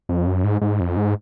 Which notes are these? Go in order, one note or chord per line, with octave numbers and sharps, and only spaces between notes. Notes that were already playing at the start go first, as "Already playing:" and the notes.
F2
F#2
G#2
G#2
F2
G#2